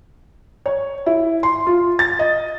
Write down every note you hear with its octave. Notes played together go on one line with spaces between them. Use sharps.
C#5
E4
C6
F4
A6
D#5